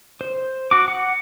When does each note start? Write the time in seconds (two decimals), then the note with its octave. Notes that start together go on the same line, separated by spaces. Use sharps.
0.21 C5
0.71 F#4 D6
0.88 F#5